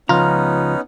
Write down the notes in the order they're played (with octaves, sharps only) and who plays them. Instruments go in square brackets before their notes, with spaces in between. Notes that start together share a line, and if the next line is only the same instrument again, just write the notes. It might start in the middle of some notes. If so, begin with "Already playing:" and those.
[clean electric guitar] C#2 F3 [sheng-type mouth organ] B3 C#4 D#4 [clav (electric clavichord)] F4 [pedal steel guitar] A#5 F6